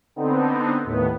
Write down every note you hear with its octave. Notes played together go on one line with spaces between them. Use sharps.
D3 B3 C4 D#4
D#2 A2 D#3 B3